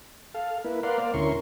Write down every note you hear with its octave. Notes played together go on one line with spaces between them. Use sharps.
A4 F5
A#3 E4 B4
A#4 B4 D5 F5 F#5 C6
A#3 C5 D5 F5
D2 C#4 E4 A#4 C6 C#6